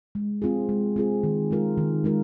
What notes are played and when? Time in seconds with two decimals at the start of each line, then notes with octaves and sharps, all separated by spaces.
0.15 G#3
0.42 C4 F4 G#4
0.69 G#3
0.96 C4 F4 G#4
1.24 D#3
1.51 G#3 F4 A#4
1.78 D#3
2.04 G#3 F4 A#4